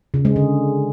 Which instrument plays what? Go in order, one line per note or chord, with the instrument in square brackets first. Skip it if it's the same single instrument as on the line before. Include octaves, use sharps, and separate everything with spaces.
[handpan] C#3
G#3
D3